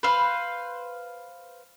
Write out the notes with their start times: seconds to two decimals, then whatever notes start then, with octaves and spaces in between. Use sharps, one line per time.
0.03 B4 C5 F5